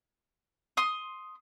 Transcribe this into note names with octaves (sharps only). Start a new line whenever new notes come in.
C6 D#6